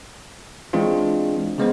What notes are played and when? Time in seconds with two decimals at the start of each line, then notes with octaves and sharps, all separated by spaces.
0.73 E3 G#3 C4 D4 F4
1.58 C#3 G#3 B3 C5